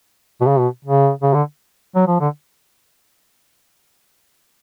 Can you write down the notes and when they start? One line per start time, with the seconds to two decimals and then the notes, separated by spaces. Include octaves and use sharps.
0.41 B2
0.47 C#3
0.59 B2
0.85 C#3
1.22 C#3
1.34 D3
1.96 F#3
2.07 F3
2.21 D3